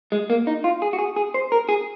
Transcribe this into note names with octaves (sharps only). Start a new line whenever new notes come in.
G#3
A#3
D#4
F4
G#4
F#4
G#4
G#4
C5
A#4
G#4